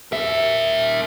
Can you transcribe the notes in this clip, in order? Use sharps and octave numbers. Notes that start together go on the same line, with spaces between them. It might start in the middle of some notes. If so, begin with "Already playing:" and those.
A#4 E5